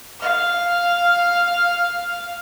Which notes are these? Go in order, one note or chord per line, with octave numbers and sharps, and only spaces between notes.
F5 F6